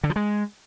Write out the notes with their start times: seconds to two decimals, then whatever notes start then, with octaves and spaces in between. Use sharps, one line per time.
0.04 D3
0.10 F3
0.16 G#3